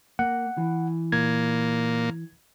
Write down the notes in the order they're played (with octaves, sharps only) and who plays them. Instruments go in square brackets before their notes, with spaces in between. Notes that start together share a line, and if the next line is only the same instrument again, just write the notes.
[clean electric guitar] A#3 [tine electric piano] F#5
[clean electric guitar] E3
[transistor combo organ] A#2 A#3 [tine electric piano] G#6